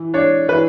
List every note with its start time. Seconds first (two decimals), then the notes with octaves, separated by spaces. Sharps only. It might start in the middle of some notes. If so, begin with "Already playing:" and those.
Already playing: E3
0.14 D4 C#5
0.49 E3 B4